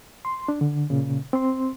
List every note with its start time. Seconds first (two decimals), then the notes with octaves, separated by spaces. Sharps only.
0.25 C6
0.48 D4
0.61 D3
0.90 A#2 C#3
1.33 C4 C6